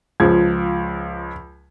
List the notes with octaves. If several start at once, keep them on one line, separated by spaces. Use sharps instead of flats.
C#2 F3 G#6